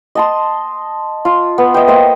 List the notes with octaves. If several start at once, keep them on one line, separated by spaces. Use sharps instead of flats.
D#5 A5 C6
F4
B3
D#5 E5 G5
A#3 C5 D#5